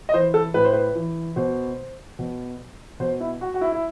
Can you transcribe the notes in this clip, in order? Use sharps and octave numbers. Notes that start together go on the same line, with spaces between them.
D#5
E3 C5
A4
A2 B4
C5
B4
E3
B2 C5
B2
B2 C5
E4
F#4
F#4
E4
E4